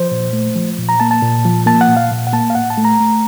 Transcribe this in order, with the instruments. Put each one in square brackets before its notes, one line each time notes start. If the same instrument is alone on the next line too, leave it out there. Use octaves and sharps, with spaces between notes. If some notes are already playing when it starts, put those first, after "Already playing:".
Already playing: [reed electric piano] F3 C5
A#2
A3
F3
A#2
A#5
A#3 A5
A5
A#2
F3
A#3 A5
F#5
A#2
F5
A#2
F#5
A#3 A5
F5
A2 F#5
A5
A3
A#5
A3